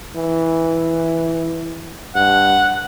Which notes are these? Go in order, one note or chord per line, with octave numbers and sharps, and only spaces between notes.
E3
G2 F#5